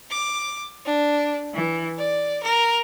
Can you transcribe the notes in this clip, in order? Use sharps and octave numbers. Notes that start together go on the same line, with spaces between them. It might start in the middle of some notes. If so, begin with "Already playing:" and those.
D6
D4
E3
D5
A#4